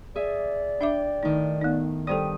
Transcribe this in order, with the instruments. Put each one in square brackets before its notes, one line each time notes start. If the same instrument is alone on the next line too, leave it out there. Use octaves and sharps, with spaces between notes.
[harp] G#4 E5 [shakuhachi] D5
[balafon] D4 E5 D6 [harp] G5
[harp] A2 D#3 [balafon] D#4
[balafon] B3 D#4
[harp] G2 D#6 [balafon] A4 C5 D5 [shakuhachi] G5